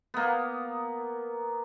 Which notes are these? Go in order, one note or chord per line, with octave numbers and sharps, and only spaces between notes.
A#3 B3